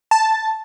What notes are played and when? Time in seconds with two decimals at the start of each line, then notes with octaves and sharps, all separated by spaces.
0.11 A5